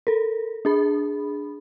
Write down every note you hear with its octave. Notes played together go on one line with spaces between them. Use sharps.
A4 A#4
D4 G#4 B5